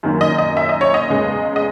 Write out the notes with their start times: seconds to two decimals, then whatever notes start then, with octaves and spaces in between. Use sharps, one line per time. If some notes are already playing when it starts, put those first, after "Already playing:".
0.03 F#2 D#3 F#3 A#3
0.21 D#5
0.38 D#5
0.57 E5
0.69 D#5
0.81 C#5
0.94 D#5
1.10 E2 C#3 G#3 B3
1.56 D#5